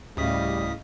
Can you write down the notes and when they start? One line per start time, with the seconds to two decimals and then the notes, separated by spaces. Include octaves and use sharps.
0.17 D2 A2 C#3 G3 D#5 F5 D#6 B6